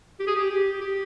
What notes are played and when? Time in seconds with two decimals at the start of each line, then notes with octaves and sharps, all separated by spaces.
0.20 G4
0.27 G#4
0.35 G4
0.50 G4
0.81 G4